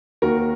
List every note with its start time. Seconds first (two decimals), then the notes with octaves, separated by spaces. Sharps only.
0.22 D#2 F#4 A#4